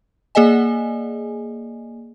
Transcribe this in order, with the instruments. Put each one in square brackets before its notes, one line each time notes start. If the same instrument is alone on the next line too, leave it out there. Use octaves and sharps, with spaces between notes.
[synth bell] A#3 G#4 D5 D#5 G#5